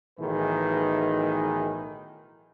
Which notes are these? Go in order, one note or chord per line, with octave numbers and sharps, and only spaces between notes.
B1 A2 D#3 E3 G#4 B4